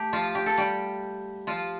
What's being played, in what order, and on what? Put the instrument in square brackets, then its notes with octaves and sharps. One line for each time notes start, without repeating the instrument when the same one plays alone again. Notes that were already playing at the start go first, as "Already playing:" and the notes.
Already playing: [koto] A3 G4
F3 F4
G4
A4
G3 G4
F3 F4